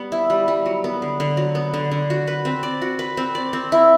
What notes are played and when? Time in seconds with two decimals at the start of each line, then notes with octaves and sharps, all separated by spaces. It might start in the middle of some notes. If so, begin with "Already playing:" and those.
Already playing: G3 B3
0.12 E4
0.30 G3
0.48 G3
0.66 F#3
0.84 B3
1.02 D3
1.20 D3
1.37 F#3
1.55 B3
1.74 D3
1.91 D3
2.10 F#4
2.27 B4
2.45 C4
2.63 D5
2.82 F#4
2.99 B4
3.17 C4
3.35 D5
3.53 C4
3.72 E4